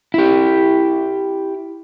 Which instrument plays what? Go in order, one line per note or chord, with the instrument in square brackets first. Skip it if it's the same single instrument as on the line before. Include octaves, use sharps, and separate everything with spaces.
[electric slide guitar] E4 G4